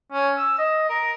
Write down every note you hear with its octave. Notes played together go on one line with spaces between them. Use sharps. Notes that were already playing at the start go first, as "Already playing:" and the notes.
C#4
E6
D#5
A#4